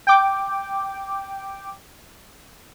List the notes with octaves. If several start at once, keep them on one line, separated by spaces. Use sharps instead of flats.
G5 D6